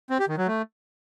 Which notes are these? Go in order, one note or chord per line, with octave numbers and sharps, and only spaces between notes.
C4
G4
D#3
F#3
A3